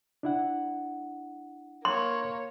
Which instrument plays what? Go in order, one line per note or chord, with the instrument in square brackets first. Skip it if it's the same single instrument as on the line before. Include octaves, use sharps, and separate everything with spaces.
[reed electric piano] D4 E4 F#5
[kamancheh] A#3 C#5 [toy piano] C6